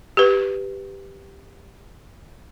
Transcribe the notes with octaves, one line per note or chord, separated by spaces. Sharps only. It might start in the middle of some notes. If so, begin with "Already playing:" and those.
G4 B4